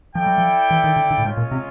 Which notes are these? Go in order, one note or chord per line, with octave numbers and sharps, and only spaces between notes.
F3 E4 A4 D5 G5
F#3
F3
E3
D#3
D3
D3
A2
G#2 G#3 C#4 F4
A#2
C3